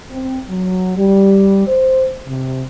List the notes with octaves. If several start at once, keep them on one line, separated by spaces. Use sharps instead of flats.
C4
F#3
G3
C5
C3